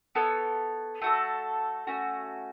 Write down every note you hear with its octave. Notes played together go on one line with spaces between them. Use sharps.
B3 A4 C#5
A3 F#4 A4
A3 C#4 F#4